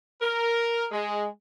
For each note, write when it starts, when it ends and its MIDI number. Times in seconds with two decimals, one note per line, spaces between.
0.21 0.85 70
0.91 1.26 56